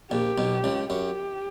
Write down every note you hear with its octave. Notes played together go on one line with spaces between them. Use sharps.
A#1 A#2 G4
B1 B2
C#2 C#3
F#2 F#3 G4